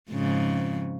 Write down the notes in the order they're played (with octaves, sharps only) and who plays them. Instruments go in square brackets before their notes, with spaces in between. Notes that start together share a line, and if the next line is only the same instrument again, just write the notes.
[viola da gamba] F2 G#2 C#3